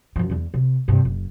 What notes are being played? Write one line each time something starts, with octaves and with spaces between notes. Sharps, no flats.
F#2 F3
E2 G#3
C3
G2 C3
F#1